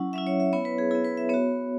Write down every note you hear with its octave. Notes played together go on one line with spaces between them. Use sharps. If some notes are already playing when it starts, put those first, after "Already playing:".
Already playing: F#3 C#4 E4 F#5
F#3 C#4 E4 E5
C#5
E5
B3 E4 C#5
B4
G#4
B3 E4 G#4
B4
E5
B3 F#4 C#5